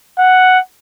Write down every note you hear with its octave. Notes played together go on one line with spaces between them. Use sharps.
F#5